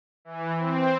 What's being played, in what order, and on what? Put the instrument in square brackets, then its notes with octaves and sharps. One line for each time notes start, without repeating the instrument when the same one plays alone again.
[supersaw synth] E3
C4